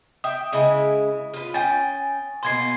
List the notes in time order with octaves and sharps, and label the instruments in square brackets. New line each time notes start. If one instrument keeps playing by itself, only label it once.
[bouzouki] E5 G5 [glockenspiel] D#6
[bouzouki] C#3 G#3 E4
F4 B4
[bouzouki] C#4 G5 [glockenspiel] G#5 A6
[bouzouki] B2 A#3 B3 [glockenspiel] C6 G#6 C7